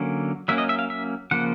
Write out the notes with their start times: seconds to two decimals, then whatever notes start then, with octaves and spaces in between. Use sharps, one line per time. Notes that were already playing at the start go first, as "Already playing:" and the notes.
Already playing: D3 F#3 A#3 C#4
0.48 F#3 A#3 C#4 E5
0.58 D#5
0.69 E5
0.79 F5
0.90 E5
1.31 C#3 F3 A#3 F#5